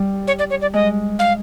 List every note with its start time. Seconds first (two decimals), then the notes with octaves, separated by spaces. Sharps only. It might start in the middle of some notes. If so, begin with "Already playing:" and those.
Already playing: G3
0.27 C#5
0.39 D5
0.50 C#5
0.62 D5
0.74 G#3 D#5
1.19 F5